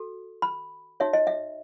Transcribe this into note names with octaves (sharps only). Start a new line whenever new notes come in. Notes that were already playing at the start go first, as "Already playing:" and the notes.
Already playing: F#4 A4
B5
D#4 F#4 C#5 E5
D#5
E5